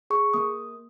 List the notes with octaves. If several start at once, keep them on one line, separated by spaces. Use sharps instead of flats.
G#4 C#6
A#3 D#6